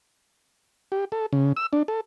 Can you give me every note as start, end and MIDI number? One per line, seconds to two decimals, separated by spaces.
0.92 1.05 67
1.12 1.26 69
1.33 1.53 49
1.57 1.66 88
1.73 1.83 62
1.88 2.01 69